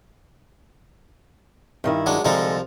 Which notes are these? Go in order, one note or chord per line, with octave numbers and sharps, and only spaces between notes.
G2 D#3 E4
F#3 G#3 D4
C2 D3 F3 G#3 D#4 A4